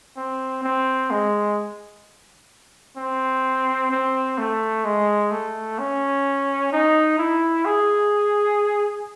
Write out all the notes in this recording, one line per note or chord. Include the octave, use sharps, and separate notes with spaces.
C4
C4
G#3
C4
C4
A3
G#3
A3
C#4
D#4
E4
G#4